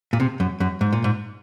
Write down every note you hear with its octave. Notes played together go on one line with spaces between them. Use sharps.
A#2
C3
F#2
F#2
G#2
A#2
G#2